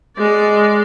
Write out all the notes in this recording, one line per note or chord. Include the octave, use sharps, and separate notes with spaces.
G#3 D5